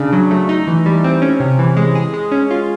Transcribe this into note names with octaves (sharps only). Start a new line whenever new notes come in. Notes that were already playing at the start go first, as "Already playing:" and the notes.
Already playing: C#3 D4
F#3
A3
D#4
E3
G3
C4
C#4
C3
E3
G#3
G#4
G#3
C#4
F4